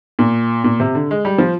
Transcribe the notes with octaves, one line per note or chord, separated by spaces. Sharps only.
A#2
A#2
C3
D3
G#3
G3
F3